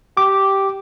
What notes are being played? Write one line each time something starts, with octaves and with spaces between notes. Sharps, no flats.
G4 D6